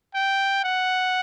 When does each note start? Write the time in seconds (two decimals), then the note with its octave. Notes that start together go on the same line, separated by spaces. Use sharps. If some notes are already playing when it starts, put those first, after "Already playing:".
0.15 G5
0.64 F#5